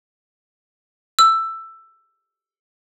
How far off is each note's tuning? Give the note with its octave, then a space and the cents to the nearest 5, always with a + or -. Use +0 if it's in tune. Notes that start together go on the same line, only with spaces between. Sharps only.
E6 +10